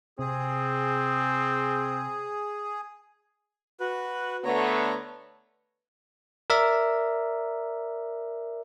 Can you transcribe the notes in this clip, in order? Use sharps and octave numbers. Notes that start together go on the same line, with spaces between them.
C3 C4 G#4
F#4 B4
D3 A3 B3 C#5 A#5
A#4 D5 E5